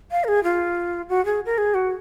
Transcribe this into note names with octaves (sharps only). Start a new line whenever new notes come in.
F5
A#4
G#4
F4
F#4
G#4
A#4
G#4
F#4